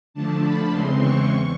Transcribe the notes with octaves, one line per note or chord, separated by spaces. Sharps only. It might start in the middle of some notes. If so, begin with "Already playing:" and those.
D3 F3 A3 D4 A5
B5
E2 C#3 E3 G#3 C4 C6
C#6
E2